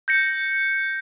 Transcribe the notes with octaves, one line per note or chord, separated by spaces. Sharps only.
G6 A#6 C#7